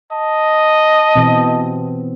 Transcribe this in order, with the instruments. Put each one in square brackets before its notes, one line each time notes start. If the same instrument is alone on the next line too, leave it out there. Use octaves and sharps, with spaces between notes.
[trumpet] D#5 [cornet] A5
[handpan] B2 E3 C4